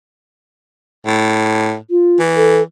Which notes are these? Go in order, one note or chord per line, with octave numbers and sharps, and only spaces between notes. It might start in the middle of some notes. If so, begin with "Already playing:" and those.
A2
F4
E3
A4